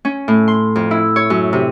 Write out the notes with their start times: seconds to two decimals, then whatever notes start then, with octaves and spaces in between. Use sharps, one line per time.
0.05 C#4
0.28 A2
0.48 C6
0.76 F2
0.91 E4
1.16 C#5
1.30 F#2
1.53 C3